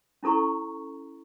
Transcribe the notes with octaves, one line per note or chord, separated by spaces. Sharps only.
C#4 E4 A4 A#5 C#6